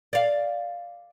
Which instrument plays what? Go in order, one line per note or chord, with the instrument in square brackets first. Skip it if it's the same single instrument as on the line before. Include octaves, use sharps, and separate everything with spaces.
[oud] D5 F5